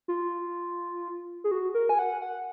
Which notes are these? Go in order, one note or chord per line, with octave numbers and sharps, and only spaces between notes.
F4
G#4
F#4
A#4
G#5
F#5
F#5